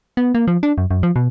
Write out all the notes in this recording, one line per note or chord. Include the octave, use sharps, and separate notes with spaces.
B3
A#3
F3
D4
F#2
F#2
F3
B2